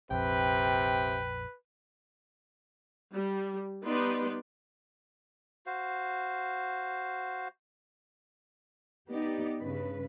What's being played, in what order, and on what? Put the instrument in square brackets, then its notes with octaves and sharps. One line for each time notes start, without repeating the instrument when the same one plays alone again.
[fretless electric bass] A#1 F2 [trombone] C3 [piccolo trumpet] B4 [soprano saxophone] G5
[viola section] G3
G3 B3 D#4 B4 D5 C6
[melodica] F#4 C5 F5
[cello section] B3 D#4 G4 D5
G2 C#3 B4